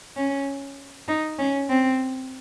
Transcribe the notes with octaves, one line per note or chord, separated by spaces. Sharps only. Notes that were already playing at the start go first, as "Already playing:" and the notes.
C#4
D#4
C#4
C4